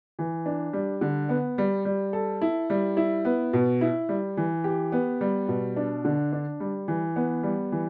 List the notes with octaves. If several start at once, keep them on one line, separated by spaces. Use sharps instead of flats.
E3
D4
G3
D3
B3
G3
G3
A4
E4
G3
E4
B3
B2
E4
G3
E3
G4
B3
G3
B2
D4
D3
D4
G3
E3
B3
G3
E3